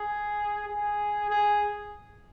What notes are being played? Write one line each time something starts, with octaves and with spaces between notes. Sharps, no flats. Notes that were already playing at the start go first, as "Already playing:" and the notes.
Already playing: G#4
G#4
G#4